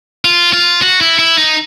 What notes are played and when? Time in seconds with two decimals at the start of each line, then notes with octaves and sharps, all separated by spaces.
0.25 F4
0.53 F4
0.82 F#4
1.01 E4
1.19 E4
1.38 D#4